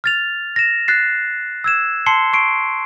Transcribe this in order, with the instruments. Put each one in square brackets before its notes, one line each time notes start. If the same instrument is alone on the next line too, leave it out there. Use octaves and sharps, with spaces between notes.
[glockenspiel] F6 A6 F7
A#6 E7
F#6 A6 C7
E6 G#6 E7
A5 C6 C7 C#7 G7
C#6 C7 D7